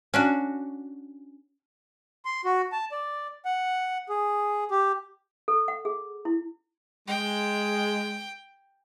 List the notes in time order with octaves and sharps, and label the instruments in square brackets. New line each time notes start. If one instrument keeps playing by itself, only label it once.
[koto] C#4 D4 F#4
[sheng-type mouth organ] C6
F#4
A5
D5
F#5
G#4
G4
[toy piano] A4
F#5
G#4
E4
[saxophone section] G#3 [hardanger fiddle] G5